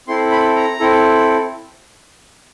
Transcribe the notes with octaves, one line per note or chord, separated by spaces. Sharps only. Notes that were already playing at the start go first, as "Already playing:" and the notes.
C4 E4 A4 C6
B5
A#5
C4 E4 A4